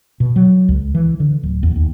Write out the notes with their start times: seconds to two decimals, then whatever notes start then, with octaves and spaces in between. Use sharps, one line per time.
0.20 B2
0.36 F#3
0.69 C#2
0.95 E3
1.20 D3
1.43 D1
1.63 E2
1.76 D#2